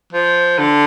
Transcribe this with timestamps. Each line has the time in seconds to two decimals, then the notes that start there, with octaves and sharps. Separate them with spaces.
0.13 F3
0.59 D3